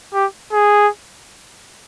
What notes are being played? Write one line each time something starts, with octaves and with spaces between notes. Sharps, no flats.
G4
G#4